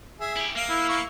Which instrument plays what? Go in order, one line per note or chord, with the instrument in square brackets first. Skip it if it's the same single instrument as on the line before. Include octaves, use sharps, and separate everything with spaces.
[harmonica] G#4 E5
[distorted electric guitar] E4 G4
[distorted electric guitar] A#3 [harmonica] F5
[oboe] E4
[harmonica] F5 C#6